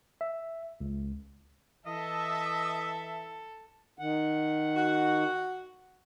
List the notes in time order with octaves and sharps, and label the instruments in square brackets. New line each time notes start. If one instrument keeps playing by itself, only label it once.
[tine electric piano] E5
C#2
[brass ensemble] E3 A5 [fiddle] A4 [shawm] D#5 [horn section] E5
[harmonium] D#3 F#5
[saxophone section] F#4